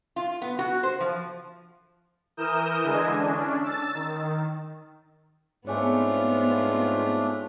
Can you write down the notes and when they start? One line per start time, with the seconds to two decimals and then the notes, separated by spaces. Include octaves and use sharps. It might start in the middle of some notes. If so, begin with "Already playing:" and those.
0.16 F4
0.42 B3
0.59 F#4
0.83 C5
1.00 F3
2.37 E3 A#4 D#6 G6 E7
2.83 D3 E3 G#3 D#5 G#5
3.13 C#4 D4
3.63 E6 A6
3.94 D#3
5.67 G#2 A3 B3 C4 D4 F4 C#5 G#5